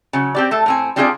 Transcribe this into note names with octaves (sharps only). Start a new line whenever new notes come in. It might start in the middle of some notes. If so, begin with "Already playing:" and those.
C#3 F#3
C4 G4 D5
A3 A4
A2 C4 G#5
G3 C4 D4 F4 G#4 D5